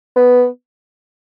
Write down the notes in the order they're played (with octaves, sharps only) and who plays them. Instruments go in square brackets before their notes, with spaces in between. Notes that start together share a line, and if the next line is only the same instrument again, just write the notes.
[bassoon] B3